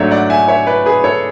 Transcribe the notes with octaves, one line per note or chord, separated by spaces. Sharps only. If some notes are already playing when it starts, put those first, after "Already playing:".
Already playing: G#2 F#3 A3 D4 C#5 E5
D5 F#5
E5 G#5
C#5 E5
B4 D5
G#4 B4
A4 C#5